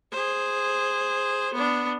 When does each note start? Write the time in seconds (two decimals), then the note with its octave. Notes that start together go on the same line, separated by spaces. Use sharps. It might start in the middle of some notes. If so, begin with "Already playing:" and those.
0.11 G#4 C5
1.54 B3 D4